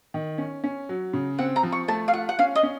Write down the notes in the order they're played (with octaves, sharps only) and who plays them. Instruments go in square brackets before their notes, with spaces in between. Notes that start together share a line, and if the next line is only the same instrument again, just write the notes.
[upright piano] D#3
C#4
C#4
F#3
C#3
[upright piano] C4 [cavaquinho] F#5
[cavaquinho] A#5
[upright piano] F3
[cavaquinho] C#6
[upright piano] A3 [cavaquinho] A5
[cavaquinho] F5
[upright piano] F4 [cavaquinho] F#5
[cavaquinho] F#5
[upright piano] C#4 [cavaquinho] F5
[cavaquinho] D#5
[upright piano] C#4